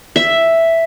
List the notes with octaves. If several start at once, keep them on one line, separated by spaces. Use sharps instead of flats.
E5